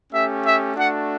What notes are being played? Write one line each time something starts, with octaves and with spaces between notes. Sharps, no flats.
A3 C#4 G4 E5
E5
A3 D4 F#4 F#5